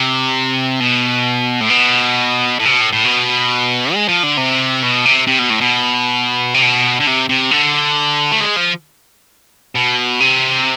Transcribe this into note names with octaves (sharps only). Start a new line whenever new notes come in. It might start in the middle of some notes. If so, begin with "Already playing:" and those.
Already playing: C3
B2
A2
B2
A2
C3
B2
A2
A2
B2
G#3
F3
D3
C3
B2
C3
C3
B2
A2
B2
C3
B2
D3
C3
C3
D3
A3
G#3
F3
B2
C3